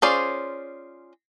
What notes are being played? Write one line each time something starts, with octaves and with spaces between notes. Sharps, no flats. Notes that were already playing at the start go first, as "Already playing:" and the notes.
C#4 F4 G#4 C5 D5